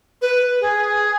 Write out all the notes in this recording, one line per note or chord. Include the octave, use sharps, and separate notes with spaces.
B4
G#4